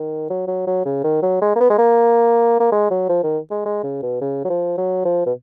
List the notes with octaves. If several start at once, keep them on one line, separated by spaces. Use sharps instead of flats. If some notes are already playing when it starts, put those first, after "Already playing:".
Already playing: D#3
F#3
F#3
F#3
C#3
D#3
F#3
G#3
A#3
B3
G#3
A#3
A#3
G#3
F#3
F3
D#3
G#3
G#3
C#3
B2
C#3
F#3
F3
F#3
F3
B2